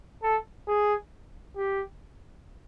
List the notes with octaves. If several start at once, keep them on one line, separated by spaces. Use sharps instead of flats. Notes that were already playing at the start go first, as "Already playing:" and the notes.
A4
G#4
G4